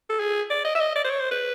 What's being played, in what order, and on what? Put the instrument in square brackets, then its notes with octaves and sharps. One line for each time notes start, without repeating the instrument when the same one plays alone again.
[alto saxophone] A4
G#4
D5
D#5
E5
D#5
D5
C5
C#5
C5
B4